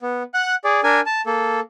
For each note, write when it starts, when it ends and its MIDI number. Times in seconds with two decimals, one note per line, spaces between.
0.01 0.23 59
0.34 0.55 78
0.34 0.55 90
0.64 0.81 68
0.64 0.81 74
0.84 1.00 62
0.84 1.00 70
0.84 1.00 80
1.06 1.21 81
1.26 1.60 58
1.26 1.60 69